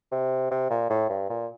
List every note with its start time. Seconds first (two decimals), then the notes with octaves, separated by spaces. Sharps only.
0.12 C3
0.51 C3
0.70 A#2
0.90 A2
1.09 G2
1.29 A#2